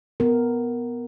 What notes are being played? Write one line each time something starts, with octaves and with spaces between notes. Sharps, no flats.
B3 A#4